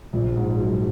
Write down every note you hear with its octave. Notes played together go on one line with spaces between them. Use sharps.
A#1
G#2
F#3